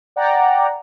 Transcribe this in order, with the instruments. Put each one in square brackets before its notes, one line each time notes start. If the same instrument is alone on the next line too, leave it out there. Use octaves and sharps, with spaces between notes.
[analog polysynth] D5 F#5 G5 A#5